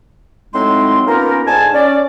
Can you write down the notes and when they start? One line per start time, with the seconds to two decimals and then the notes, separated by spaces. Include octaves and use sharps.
0.53 A2 F#3 G#3 C4 D#4 C6
1.06 A#3 B3 C#4 D#4 F4 A#4
1.46 G#2 D3 G#5 A5
1.73 C#4 D5